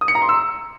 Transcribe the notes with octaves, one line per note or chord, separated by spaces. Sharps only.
D#6
C#7
A#5
C6
E6